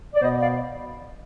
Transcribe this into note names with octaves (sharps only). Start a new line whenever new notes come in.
D5
B2 B3 C5 D#5
D5 F5